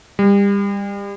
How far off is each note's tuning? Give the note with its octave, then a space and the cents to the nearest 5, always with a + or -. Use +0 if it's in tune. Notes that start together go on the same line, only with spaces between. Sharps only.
G3 +35